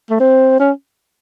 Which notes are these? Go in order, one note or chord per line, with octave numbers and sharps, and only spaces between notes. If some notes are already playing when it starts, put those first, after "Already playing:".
A3
C4
C#4